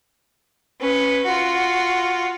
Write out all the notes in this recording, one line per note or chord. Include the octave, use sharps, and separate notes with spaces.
C#4 B4
F4 F#4